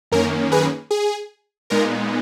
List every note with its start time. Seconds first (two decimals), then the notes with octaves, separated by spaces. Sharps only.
0.12 F#2 D#3 A#3 C#4 A#4
0.52 G#4 B4
0.91 G#4
1.70 A#2 G#3 B3 D#4 A#4